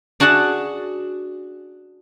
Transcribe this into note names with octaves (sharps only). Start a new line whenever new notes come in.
D4 F#4 G#4 F#5 A5